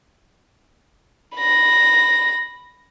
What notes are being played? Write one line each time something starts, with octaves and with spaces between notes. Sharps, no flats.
B5 A#6